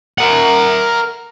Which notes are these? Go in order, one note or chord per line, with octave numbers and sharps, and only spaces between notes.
A#4 F#5